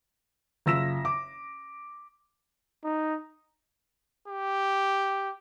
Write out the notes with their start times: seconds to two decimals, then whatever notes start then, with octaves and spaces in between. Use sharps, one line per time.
0.66 F#1 F4 E6 A#6 B6 E7
1.05 D6
2.84 D#4
4.28 G4